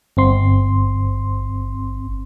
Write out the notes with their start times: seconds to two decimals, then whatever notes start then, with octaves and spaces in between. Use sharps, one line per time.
0.17 G1 C4 C6